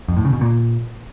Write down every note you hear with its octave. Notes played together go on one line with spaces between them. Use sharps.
F2
A2
C#3
B2
A#2